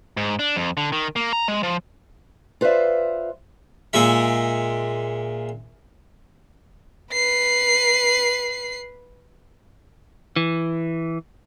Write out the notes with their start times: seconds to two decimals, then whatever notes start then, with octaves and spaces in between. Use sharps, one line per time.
0.17 G#2
0.39 D4
0.56 F2
0.77 D3
0.92 D#3
1.16 A#3
1.33 A#5
1.48 G#3
1.63 F3
2.61 F4 B4 C5 D5 E5
3.93 A#2 G#3 E5
7.13 B4 C7
10.36 E3